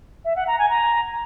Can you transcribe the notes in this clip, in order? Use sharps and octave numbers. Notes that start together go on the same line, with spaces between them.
E5
F#5
A#5
G#5
A#5